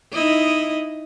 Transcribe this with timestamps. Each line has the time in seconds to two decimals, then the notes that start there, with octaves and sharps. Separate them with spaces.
0.12 D#4 E4 D#5